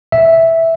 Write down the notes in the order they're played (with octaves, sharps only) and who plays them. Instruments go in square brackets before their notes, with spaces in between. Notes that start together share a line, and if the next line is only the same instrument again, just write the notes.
[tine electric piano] E5